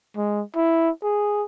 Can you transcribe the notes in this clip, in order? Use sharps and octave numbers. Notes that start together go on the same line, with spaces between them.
G#3
E4
G#4